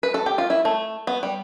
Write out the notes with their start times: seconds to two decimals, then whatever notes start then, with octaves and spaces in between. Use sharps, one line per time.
0.03 B4
0.14 A4
0.26 G4
0.38 F4
0.50 E4
0.65 A3
1.07 B3
1.23 G3